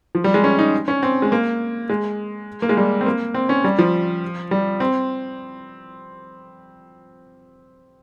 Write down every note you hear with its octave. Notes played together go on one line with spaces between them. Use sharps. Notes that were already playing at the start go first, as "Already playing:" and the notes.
F3
G3
G#3
C#4
D#4
C#4
C4
G#3
A#3
G#3
A#3
G#3
G3
C4
A#3
C4
C#4
G3
F3
G3
C4